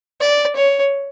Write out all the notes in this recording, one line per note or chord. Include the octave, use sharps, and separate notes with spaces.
D5
C#5